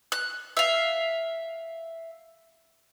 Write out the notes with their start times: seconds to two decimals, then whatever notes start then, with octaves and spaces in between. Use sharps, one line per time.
0.12 F#6
0.57 E5 F5